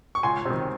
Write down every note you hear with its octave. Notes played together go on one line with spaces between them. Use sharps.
C#6
C#2 G#5 C6
C3 D#3